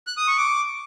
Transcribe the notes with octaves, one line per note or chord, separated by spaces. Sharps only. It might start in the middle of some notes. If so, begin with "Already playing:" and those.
F#6
D#6
C#6
D6